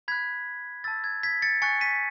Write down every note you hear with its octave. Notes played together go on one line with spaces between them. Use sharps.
B5 F#6 G#6 B6
A5 E6 A6
G#6
G#6 B6
A6 C#7
G#5 C#6 F#6 A6 C#7
B6 D#7